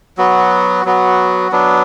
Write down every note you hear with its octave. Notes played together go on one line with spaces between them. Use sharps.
F#3 B3 F#4
F#3 B3 F#4
F#3 B3 D4